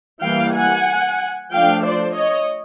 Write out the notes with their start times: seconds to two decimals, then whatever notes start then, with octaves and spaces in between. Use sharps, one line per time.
0.21 E3 G3 A#3 F5 G5
0.54 F#5 G#5
1.51 F3 A3 D4 F5 G5
1.83 C5 D5
2.15 C#5 D#5